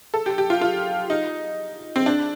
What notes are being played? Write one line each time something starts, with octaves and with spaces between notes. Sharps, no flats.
A4
G4
G4
F4
F4
D#4
C4
D4